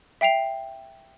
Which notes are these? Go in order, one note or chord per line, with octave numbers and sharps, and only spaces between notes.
E5 G5 C7 F7